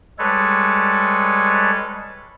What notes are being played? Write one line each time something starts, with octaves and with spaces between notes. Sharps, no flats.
G3 G#3 A4 B4 C#5